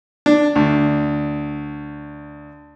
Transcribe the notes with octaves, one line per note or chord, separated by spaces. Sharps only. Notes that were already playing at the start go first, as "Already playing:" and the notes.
D4
D2